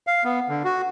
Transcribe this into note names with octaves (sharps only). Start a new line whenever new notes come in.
F5
B3
D3
F#4